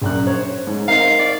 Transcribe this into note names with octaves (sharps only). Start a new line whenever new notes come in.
A#1 F#2 F#6
C5 C#5
G#2
C4 D#4 A#4 F5
D5